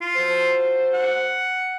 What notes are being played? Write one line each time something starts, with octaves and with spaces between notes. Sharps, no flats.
F4
F#4 A4 C5
F#5